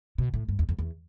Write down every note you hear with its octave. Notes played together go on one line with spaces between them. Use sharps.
B2
A2
G2
E2
F2
E2